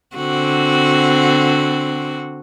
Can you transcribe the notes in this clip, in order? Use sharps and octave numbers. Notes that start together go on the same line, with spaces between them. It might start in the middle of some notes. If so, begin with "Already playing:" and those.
D3 C4 F#4